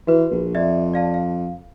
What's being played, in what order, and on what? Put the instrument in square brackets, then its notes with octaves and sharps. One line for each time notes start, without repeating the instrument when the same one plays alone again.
[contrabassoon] E3 [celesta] F#4 B4
[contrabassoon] A#1
[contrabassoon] F2 [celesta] D5 E5
[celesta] D5 F5 A5
F5